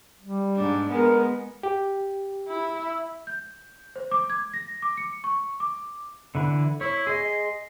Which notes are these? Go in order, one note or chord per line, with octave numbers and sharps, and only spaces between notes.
G3
G#2 D4
G#3 B3 A#4
G4
E4
G6
C5
D6
G#6
A#6
D6
C#7
C#6
D6
D3 E3 B5
E4 C#5
G#4 D#5 C6